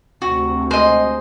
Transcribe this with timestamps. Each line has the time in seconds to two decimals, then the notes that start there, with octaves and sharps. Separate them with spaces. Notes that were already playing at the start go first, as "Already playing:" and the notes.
0.22 D2 C3 F#4
0.71 G#3 C5 D#5